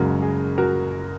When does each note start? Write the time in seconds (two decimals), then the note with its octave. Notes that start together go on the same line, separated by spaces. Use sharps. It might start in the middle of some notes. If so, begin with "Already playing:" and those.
Already playing: F#1 F#2 C#3 G#3 F#4 A#4
0.22 G#4
0.58 F#4 A#4